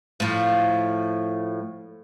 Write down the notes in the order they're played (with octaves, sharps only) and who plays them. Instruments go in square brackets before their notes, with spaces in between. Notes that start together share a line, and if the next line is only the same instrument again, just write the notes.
[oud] A2 F3